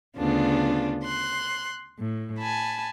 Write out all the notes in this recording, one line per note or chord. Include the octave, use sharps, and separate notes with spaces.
D2 C#3 B3 D4 F4
C6 F#6
A2
G#5 A5 B5